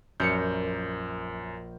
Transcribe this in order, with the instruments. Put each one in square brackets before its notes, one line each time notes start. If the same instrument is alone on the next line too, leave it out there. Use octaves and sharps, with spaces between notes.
[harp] A#1 A#4 C#7 [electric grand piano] F#2 G6